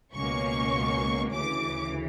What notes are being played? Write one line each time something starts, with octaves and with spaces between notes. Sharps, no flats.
C#2 B2 A#3 C#4 C#6
D2 C#3 E3 D6